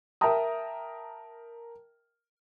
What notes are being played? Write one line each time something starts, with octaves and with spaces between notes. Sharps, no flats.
A#4 E5 G5 A5 A#5 D#6